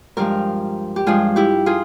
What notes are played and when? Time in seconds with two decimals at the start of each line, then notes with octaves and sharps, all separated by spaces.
0.17 G2 F3 G#3 G4 A#4
0.96 G4
1.06 G2 F3 G#3 F4 G#4
1.36 E4 G4
1.66 F4 G#4